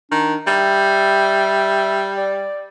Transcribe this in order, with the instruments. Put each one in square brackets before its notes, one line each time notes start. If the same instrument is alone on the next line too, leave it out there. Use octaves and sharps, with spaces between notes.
[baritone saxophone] D#3 [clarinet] D4
[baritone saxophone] G3 [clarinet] E5
[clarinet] D5